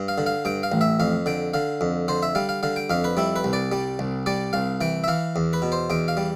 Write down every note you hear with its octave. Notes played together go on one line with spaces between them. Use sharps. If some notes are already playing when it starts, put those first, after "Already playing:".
Already playing: G2
F5
D3
F5
G2 G5
F5
A1
E5
F2 F5
D3 G5
D3 F5
F2
D3 C5
E5
G3 F5
F5
D3 F5
G5
F2 F5
B4
G3 E4
B4
C2
D5
G3
C2
G3 D5
C2 F5
E3 G5
E5
E3 F5
E2
B4
B2
C5
E2 G5
F5
G3